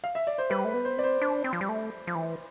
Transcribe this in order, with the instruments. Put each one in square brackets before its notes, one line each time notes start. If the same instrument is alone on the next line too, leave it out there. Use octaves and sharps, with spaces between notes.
[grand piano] F5
E5
D5
C5
[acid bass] G3 [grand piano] B4
[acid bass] A3 [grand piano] B4
[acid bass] B3
[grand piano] C5
[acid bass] C4 [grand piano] D5
[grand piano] C5
[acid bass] D4
C4
F3
G3
A3
F3
E3